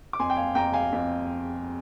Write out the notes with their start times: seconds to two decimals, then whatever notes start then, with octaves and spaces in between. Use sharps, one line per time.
0.13 D6
0.19 F2 G#5 C6
0.30 G5
0.37 F5 G#5
0.55 F2 G5 A#5
0.73 F5 G#5
0.93 F2